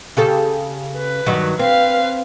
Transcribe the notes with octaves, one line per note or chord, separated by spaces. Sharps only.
C#3 G4 A4
B4
G2 D#3 F#3
C4 B4 F5